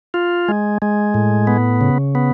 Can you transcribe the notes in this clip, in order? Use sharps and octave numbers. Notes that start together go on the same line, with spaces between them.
F4
G#3
G#3
A2
B3
C#3
B3